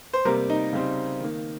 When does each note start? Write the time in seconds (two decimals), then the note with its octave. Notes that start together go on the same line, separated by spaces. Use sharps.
0.13 C5
0.25 C3 G3 A#3 A#4
0.50 D#4
0.73 C#3 G3 C4
1.20 D#3 A#3